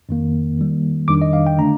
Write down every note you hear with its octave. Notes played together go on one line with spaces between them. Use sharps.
F2 D#3 A#3
D#3 G3 A#3
F2 D#3 G3 D4 D6
D#5
F5
G5
D3 A3 D4 A#5